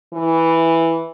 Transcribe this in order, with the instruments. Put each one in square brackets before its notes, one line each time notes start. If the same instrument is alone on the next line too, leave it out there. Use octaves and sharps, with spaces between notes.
[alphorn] E3